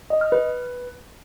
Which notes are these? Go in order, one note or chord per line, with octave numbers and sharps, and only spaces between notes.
D#5
F6
B4